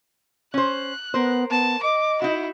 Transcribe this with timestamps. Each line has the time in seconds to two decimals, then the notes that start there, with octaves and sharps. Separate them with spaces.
0.54 C#4 C5 F#6
1.14 B3 A#4 C5
1.51 B3 A5
1.83 D#5 D6
2.22 D#4 E4 F#4